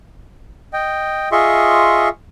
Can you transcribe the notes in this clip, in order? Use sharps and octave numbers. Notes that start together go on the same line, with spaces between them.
D#5 G5
F4 G#4 D#5 E5 C6 C#6